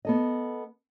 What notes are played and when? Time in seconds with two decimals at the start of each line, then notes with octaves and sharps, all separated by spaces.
0.05 B3 A4 D#5